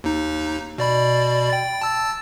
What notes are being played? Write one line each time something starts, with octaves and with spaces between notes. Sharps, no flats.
D#2 D#4
B2 D5 B5
G5 A6
A5 E6 A6